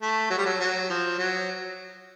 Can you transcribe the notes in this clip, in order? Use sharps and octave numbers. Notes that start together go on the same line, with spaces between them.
A3
F#3
G3
F#3
F#3
F3
F#3